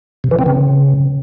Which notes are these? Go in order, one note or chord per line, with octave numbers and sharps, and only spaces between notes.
C3
E3
C4
C#3